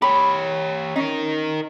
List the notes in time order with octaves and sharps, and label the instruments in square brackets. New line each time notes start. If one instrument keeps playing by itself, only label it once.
[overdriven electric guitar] G4 C#5 [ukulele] B5
[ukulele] C#4 [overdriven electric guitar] D#4 A#4